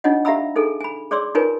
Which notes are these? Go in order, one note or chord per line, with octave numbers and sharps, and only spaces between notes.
D4 D#4 F4 C#5 D#5 F#5
G4 E5 F5 A#5 B5 E6
D#4 G#4 A4 G#5
G#5 B5
G#4 C#5 D5 C6 D6 E6
D#4 F4 A#4 B4 C#5 G#5